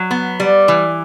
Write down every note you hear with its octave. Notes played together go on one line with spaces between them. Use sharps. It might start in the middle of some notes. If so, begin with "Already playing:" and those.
Already playing: F#3
B3
G3
E3